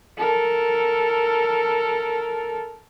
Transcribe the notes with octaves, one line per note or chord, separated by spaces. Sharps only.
A4 A#4